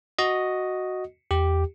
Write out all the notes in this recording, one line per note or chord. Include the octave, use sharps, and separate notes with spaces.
F#4 D#5
E2 G4